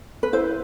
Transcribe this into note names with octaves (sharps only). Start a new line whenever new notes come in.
B4
E4 C5